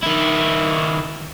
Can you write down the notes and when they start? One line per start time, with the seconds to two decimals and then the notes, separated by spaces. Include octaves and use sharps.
0.03 D#3 E4